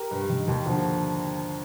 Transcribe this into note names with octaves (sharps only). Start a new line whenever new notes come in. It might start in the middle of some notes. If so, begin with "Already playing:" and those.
Already playing: G4 A#4
G2
D#3
D#2
D3 F3